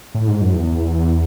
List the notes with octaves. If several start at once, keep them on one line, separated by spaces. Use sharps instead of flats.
A2
G#2
F#2
E2